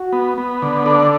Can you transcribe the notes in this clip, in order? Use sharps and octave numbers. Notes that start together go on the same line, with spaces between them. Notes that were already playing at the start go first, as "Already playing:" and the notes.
Already playing: F#4
B3
B3
D3
D4 A4